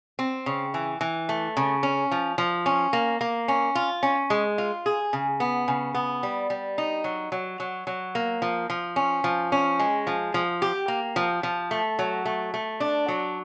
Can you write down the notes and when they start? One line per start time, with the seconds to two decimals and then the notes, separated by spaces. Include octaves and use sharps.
0.19 C4
0.46 C#3
0.74 E3
1.01 E3
1.29 A3
1.57 C#3
1.83 C#4
2.11 F3
2.38 F3
2.66 C#4
2.93 A#3
3.21 A#3
3.48 C#4
3.75 F4
4.03 C#4
4.30 G#3
4.58 F4
4.86 G#4
5.13 C#3
5.40 B3
5.68 C#3
5.94 B3
6.23 G3
6.50 G3
6.78 D#4
7.04 F#3
7.32 F#3
7.60 F#3
7.87 F#3
8.15 A#3
8.42 F3
8.70 F3
8.96 C#4
9.24 F3
9.52 C#4
9.79 G#3
10.07 F3
10.34 F3
10.62 G4
10.88 A#3
11.16 F3
11.43 F3
11.71 A3
11.99 F#3
12.25 A3
12.54 A3
12.80 D4
13.08 F#3